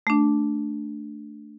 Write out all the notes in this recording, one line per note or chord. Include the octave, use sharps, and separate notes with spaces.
A3 D4